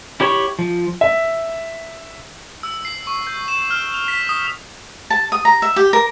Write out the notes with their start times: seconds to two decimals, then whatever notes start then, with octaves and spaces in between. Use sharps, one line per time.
0.20 E4 G4 C#5 B5 C#6
0.59 F3
1.01 E5
2.63 E6
2.85 C7
3.07 C#6
3.27 G6
3.48 E7
3.70 F6
3.94 F7
4.08 B6
4.29 D#6
5.10 A5
5.32 D#6
5.45 A#5
5.62 E5
5.76 G4
5.93 A#4